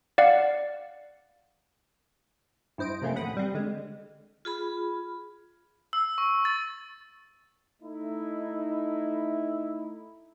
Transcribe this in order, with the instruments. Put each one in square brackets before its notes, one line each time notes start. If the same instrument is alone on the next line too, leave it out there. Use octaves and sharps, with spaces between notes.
[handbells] D5 F5 F#5
[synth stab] G2 E4 C5 D#5 D7
C3 F3 A3 A#3 C4 C#4
A1 D#2 F#5 B5 D#6
G3 C4
D3 G#3
[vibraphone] F4 G#4 B5
[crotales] E6
C#6
A6
[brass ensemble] A3 D#4 E4